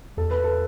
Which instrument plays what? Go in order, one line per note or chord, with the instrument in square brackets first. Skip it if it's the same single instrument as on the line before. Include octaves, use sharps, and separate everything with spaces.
[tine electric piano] E2 [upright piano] A4
[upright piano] B4
A4